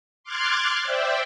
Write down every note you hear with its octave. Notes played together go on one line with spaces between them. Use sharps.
C6 D6 F6 F#6 G#6 A6
C5 D5 E5 G5